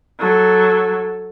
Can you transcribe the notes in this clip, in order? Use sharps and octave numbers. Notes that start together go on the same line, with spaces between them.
F#3 A4